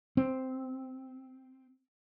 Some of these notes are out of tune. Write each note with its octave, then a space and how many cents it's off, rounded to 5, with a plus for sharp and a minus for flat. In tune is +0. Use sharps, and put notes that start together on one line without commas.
C4 -5